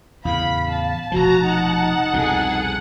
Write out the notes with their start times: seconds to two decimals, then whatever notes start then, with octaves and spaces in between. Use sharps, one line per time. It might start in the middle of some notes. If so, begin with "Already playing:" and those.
0.25 E2 A2 C#3 F5 B5
0.72 A5
1.12 F1 B2 F3 F#4 A#5
1.41 D#4 F#5
2.13 C2 F2 B2 G#4 A4